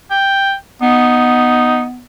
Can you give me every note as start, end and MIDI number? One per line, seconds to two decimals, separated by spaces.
0.11 0.53 79
0.82 2.02 59
0.82 1.83 63